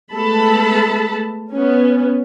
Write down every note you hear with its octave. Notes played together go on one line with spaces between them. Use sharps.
G#3 A3 B3 A4 A5 B5
B3 C#4